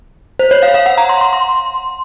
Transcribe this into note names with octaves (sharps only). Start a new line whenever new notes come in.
C5
C#5
F5
F5
F#5
A#5
C6
C6
C6